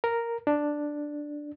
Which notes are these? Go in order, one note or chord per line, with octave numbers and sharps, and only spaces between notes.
A#4
D4